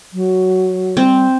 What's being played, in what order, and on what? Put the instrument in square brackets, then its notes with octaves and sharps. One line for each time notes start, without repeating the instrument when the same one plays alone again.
[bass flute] F#3
[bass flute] G3 [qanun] C4